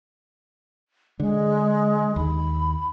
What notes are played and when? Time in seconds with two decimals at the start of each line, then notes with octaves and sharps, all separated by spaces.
1.20 D3 G#3
2.16 D#2 B5